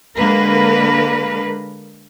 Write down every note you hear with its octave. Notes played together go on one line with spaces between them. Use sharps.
D3 G#3 A#3 A#4 B4